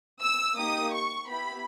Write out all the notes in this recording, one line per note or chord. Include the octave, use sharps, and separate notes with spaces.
E6
A#3 D#4 G4 D#6
C#6
B3 E4 G4 B5